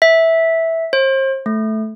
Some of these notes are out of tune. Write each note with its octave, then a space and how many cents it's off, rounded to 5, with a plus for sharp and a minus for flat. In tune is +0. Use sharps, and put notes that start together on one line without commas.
E5 -10
C5 +35
A3 -10